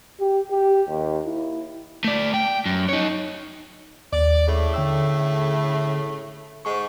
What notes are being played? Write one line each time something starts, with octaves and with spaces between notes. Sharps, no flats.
G4
G4
D#2
E4
A3 D5
G5
F#2
D#4 C#5
D#2 D5
A2 C#3 A3
D3 G5 E6
G#2 C#6